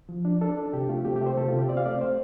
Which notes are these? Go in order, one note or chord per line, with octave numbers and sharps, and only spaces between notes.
F3
D4
D4 A4
D4
C3 G4
A3 F4
C3 G4
G4
A3
C5
C3 A4
C3 F4
G4
C4 D5
F5
A3 D5
C5